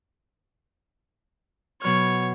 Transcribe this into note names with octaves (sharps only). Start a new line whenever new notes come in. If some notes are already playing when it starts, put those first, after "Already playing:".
B2 F#3 C#5 F6